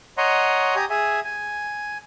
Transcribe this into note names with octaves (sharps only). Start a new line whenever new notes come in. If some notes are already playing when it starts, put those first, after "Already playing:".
C#5 D#5 F#5 A#5 C6
G4 G#5 A#5 D#6
G#4 E5 G#5
G#5